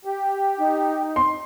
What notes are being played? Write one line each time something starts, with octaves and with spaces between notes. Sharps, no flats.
G4
D#4
C6